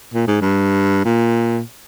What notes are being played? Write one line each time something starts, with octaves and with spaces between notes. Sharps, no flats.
A#2
G#2
G2
A#2